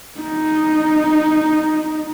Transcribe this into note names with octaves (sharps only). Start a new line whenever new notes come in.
D#4